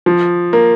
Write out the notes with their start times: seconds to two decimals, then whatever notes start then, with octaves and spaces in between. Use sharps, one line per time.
0.06 F3
0.53 A#3